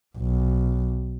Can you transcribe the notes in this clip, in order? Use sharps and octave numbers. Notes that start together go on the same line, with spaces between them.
B1